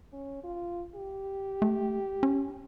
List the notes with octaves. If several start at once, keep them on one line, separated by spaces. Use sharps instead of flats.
C#4
F4
G4
A3
C#4